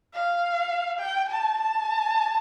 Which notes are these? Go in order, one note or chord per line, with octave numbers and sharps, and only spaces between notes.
F5
G5
A5
A5